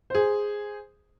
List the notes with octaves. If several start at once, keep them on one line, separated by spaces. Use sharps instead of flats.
G#4 C5